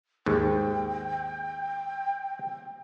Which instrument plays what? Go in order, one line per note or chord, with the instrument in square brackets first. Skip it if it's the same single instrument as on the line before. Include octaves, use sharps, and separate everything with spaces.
[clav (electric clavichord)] D#2 G#2 [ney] G5